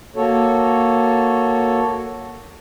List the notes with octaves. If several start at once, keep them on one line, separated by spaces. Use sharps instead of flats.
A#3 F#4 A4 C#5